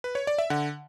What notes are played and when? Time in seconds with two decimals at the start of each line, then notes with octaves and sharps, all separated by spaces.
0.04 B4
0.15 C#5
0.27 D5
0.38 E5
0.50 D3 F#5